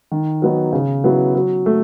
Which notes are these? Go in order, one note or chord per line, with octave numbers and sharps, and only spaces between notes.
D#3
F#3 B3 D#4
C#3
F#3 B3 E4
F#3
A3